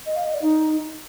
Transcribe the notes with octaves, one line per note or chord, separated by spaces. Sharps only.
D#5
F5
D#5
D5
D#4